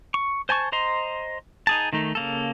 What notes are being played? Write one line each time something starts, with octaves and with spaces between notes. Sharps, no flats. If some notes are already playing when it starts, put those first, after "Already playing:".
C#6
C5 G#5 A5 C#6
C5 D#5 A#5 C6
D#4 G#4 A5
D#3 A3 D#4
C#3 A#3 A4